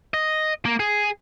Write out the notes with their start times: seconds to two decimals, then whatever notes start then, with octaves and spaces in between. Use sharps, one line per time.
0.14 D#5
0.65 A#3
0.80 G#4